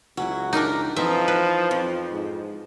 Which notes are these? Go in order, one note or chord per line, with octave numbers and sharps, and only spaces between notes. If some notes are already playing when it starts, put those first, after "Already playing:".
C#2 F#3 C#4 E4 F#4
F#2 D4 D#4 G4 A#4
E3 F3 C4 D#4 F4 A4 E5
B4
F2
G#2